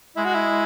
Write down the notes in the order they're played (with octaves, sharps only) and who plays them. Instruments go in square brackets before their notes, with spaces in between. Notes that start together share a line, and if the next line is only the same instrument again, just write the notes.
[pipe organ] G#3 [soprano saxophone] E4
[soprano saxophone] F#4
E4